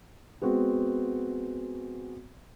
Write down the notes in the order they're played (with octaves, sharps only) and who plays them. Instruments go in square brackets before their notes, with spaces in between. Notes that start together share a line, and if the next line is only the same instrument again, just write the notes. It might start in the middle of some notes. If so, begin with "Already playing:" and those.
[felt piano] G#3 B3 C4 F#4